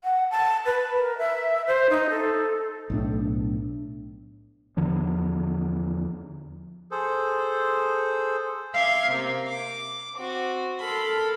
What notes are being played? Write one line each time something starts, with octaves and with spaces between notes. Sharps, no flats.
F#5
A5
B4
A#4
E5
C5
D#4
A4
B1 A2 D4
E2 D3 F3
G#4 A4 C5
E5 F5 C6 D6 G#6
C3 A#3
D6
C4 F#4
A4 A#4 B5 C6